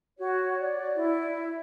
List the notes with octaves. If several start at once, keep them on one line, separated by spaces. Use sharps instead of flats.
F#4 C#5
D5
E4